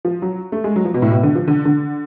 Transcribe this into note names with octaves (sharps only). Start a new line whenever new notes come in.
F3
F#3
A3
G#3
F#3
F3
B2
A2
B2
D3
F3
D3
D3